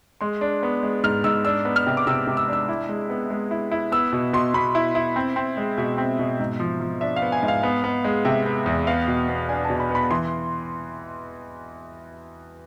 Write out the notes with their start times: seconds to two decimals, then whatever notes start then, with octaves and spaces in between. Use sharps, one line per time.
0.21 G#3 C6
0.41 D4
0.63 B3
0.83 G#3
1.04 G#2 F6
1.24 G#2 E6
1.45 D4 E6
1.65 B3
1.76 F6
1.87 C3
1.97 D6
2.07 C3 E6
2.27 C3
2.37 E6
2.48 D4 E6
2.69 E4
2.89 G#3
3.10 B3
3.30 G#3
3.51 E4
3.71 E4
3.92 B3 E6
4.13 B2
4.33 B2 C6
4.54 B2 B5
4.75 E4
4.95 E4
5.16 C4
5.36 C4
5.57 G#3
5.78 B2 E5
5.98 C4
6.19 B2
6.40 G#2
6.60 F3
6.81 F3
7.01 D4 E5
7.16 F5
7.22 B3
7.32 G#5
7.43 G#2
7.48 F5
7.63 B3
7.84 B3
8.04 G#3
8.25 C3 E5
8.46 B3
8.66 E2
8.87 B3 F5
9.07 B2
9.28 B3
9.49 D4 G#5
9.64 A5
9.70 B2
9.80 B5
9.90 B3 B5
10.11 E3 C6